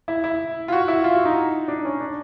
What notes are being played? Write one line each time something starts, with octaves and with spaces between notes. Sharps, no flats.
E4
E4
F4
F#4
E4
F4
F#4
D#4
D4
C#4
D4